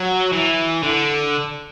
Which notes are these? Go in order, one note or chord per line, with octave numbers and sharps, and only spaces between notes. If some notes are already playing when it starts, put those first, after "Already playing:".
Already playing: F#3
E3
D3